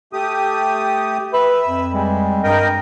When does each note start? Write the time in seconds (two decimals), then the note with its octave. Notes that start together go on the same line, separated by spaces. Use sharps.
0.13 A3 G4 D#6
1.33 B4 E5
1.67 F2
1.93 G3 G#3
2.44 G2 A#4 D#5 G5